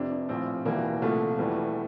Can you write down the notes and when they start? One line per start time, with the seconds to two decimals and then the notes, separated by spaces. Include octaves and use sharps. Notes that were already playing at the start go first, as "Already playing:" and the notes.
Already playing: F1 F2 C3 D4
0.11 D4
0.29 A#1 A2 F3 C4
0.65 E1 E2 E3 G3 A#3
1.02 C2 A#2 F3 A3
1.38 E1 E2 E3 G3